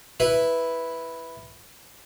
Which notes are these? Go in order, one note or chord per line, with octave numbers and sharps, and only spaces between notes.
E4 B4